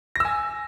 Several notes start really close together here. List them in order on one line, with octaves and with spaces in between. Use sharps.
A#6 E6 G#5